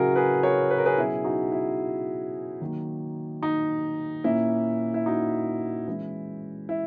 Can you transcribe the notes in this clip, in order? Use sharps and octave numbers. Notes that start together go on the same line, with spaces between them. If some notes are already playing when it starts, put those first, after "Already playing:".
Already playing: C#3 F#3 C#4 E4 F#4 G#4 A#4
G#4 B4
A#4 C#5
B4
A#4
G#4 B4
B2 F#3 C#4 E4 G#4
D#4 F#4
E4
D#3 F#3 A#3
D#4
A#2 A#3 C#4 E4
E4
D#4 F#4
E3 G#3 C#4 E4
E4